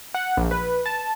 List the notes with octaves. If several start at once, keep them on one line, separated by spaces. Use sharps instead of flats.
F#5
A#1
B4
A5